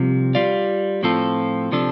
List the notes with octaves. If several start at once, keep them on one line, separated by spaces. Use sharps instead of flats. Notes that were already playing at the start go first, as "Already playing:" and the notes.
Already playing: C2 C3 F3
G3 F4 D5 F5
A2 F3 C4 F4 A4
C3 F3 D4 A4